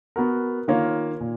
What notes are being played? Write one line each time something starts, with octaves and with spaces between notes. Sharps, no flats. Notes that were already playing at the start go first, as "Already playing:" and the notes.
B3 F#4 A#4
D#3 A#3 F4 A#4 C#5
A#2